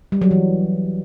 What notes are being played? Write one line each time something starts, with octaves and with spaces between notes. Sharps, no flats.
G3
F#3
E3